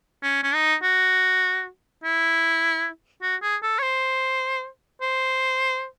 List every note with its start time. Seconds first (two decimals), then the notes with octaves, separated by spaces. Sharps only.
0.23 C#4
0.43 C#4
0.54 D#4
0.83 F#4
2.04 E4
3.22 F#4
3.42 G#4
3.63 A4
3.79 C#5
3.83 C5
5.01 C5